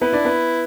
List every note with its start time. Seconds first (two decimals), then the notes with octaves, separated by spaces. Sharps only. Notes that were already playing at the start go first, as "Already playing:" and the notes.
0.01 B3 E4 B4
0.13 D4 D5
0.25 B3 B4